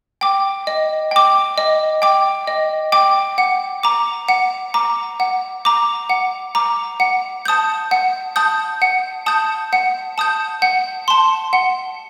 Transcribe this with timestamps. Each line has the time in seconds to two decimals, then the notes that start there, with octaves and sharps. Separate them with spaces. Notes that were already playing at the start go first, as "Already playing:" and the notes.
0.21 G5 D6
0.67 D#5
1.11 G5 D6
1.58 D#5
2.02 G5 D6
2.47 D#5
2.92 G5 D6
3.38 F#5
3.83 A#5 D6
4.28 F#5
4.74 A#5 D6
5.20 F#5
5.65 A#5 D6
6.10 F#5
6.55 A#5 D6
7.00 F#5
7.45 A5 D#6 G6
7.91 F#5
8.36 A5 D#6 G6
8.82 F#5
9.26 A5 D#6 G6
9.73 F#5
10.18 A5 D#6 G6
10.62 F#5
11.08 A5 C6
11.53 F#5